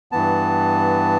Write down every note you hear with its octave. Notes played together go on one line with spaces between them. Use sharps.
G2 E3 B3 A5